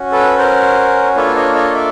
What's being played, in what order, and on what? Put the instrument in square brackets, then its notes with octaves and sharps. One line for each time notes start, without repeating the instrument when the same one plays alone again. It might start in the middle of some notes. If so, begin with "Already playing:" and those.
Already playing: [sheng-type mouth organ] C#4 F#4
A4 B4
A#4 C5
A#3 D4 F4 A4 B4 C#5
C#5 D#5
C#5 D#5
D5 E5